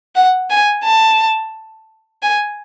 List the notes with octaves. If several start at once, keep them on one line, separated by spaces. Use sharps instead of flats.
F#5
G#5
A5
G#5